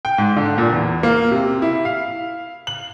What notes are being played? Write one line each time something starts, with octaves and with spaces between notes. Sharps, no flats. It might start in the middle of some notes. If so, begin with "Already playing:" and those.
G5
G#2
D3
A#2
E2
A#3
C3
E4
F5
F#7